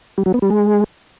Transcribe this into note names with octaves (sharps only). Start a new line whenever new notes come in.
G3
F#3
B3
G3
G#3